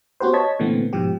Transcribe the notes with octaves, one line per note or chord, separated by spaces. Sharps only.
B3 C#4 F#4 G4 B4 C5
C#5 D#5 A5 G#6 B6
A#2 D3 E3 A3 B3 C4
G#2 B2 F3 G4